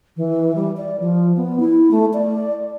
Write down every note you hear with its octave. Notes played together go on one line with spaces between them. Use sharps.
E3
G3
D5
F3
B3
E4
A3
D5